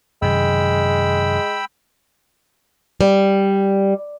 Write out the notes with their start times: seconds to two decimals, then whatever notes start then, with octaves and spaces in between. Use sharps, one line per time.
0.22 F#2 C3 D#3 G#3 G5 B5 E6
3.01 G3